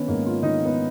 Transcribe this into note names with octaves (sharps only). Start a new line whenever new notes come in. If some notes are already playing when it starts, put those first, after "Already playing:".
Already playing: D#3 B3 C#4
G#2 A#3
F4
D#3 D#4
B3